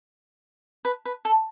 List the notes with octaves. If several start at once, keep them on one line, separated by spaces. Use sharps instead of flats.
B4
B4
A4